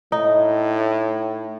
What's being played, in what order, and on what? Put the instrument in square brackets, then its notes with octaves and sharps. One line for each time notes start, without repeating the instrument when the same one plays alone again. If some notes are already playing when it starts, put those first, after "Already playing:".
[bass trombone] A2 [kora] D#4